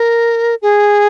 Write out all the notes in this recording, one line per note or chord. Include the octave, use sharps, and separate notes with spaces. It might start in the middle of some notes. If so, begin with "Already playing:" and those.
Already playing: A#4
G#4